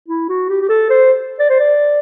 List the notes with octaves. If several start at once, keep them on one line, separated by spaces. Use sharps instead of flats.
E4
F#4
G4
G4
A4
C5
D5
C5
D5